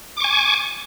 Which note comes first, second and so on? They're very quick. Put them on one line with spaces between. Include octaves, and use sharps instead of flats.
D6 C#6 G#5